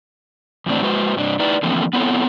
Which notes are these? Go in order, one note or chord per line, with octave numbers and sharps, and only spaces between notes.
E2 A2 C4 D4
G#3 F#4 B4 C5
G2 C3 D4
D#4 E4 B4 D5
D3 E3 F3 A3 A#3 C4
B3 C4 E4 A4 C#5